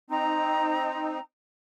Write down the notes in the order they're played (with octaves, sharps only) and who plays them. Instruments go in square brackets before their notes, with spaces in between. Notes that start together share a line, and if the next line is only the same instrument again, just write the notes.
[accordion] C4 D#4 [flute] A#5